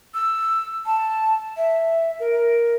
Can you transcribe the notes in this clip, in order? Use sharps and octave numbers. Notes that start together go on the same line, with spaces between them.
E6
A5
E5
A#4